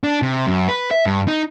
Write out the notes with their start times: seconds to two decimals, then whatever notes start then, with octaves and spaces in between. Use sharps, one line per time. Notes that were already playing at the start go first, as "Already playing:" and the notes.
0.04 D4
0.22 C3
0.47 F#2
0.68 B4
0.91 E5
1.06 G2
1.27 D#4